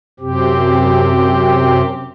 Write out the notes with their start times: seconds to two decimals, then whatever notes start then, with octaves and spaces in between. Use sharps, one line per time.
0.20 F#2 C3 C4 G4